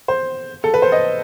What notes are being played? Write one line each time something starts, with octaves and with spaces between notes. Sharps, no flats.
C5
A4
B4
C5
D#5